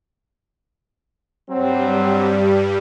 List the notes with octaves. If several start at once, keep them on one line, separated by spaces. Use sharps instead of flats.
G2 F#3 G3 C4